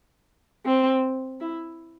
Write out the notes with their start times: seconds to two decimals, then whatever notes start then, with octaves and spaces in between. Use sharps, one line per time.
0.65 C4
1.41 E4